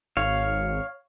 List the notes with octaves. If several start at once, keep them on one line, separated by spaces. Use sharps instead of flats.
G#1 C#5 F5